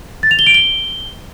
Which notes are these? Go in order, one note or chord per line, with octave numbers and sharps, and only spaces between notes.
A6
F7
G7
D7
G7